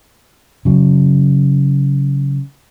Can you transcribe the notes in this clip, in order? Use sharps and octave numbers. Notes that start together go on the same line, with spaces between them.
C#3 F#3